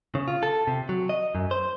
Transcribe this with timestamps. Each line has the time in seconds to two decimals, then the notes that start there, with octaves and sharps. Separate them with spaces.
0.15 C#3
0.28 F4
0.43 A4
0.67 C3
0.89 F#3
1.09 D#5
1.35 F#2
1.51 C5